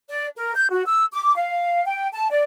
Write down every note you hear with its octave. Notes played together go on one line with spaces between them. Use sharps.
D5
A#4
G6
F#4
E6
D6
F5
G5
A5
D5